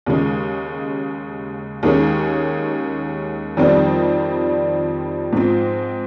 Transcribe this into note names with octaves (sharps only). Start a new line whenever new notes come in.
D#2 C#3 G#3
D#2 D#3 G#3 C#4 G#4
F2 D#3 G3 C4
G#2 F3 C4